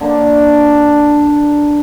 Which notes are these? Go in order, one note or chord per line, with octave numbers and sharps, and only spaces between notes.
D3 A#3 D4